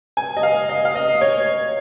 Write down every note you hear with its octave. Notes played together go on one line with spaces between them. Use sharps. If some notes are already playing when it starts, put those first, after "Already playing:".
G#5
D#5
F5
D#5
F5
D#5
C#5